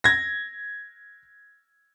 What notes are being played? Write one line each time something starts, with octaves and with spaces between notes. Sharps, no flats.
G#6 A#6